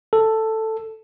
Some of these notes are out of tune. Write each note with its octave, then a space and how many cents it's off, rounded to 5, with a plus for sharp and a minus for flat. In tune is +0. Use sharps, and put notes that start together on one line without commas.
A4 +5